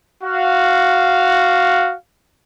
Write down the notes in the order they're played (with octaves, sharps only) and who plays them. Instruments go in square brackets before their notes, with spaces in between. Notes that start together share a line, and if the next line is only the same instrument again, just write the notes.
[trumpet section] F#4 F5